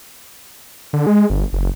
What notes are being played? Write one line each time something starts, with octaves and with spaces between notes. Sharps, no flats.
D3
G#3
G1
F#1